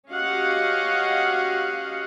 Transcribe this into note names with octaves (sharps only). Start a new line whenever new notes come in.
C#4 F#4 G4 D#5 F5 F#5